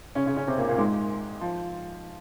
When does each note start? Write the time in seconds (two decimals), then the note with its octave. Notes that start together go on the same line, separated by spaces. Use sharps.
0.15 C#3 C#4
0.26 C#3 C#4
0.37 C#3 C#4
0.47 C3 C4
0.58 A#2 A#3
0.68 A#2 A#3
0.78 G#2 G#3
1.41 F3